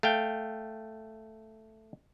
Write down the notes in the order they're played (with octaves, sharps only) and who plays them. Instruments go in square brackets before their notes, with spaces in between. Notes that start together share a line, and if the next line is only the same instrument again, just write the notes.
[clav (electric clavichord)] A3 F5 G5